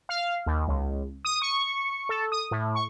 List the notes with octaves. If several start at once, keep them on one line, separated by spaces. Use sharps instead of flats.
F5
D#2
C#2
D#6
C#6
A4
D#6
A2
C#6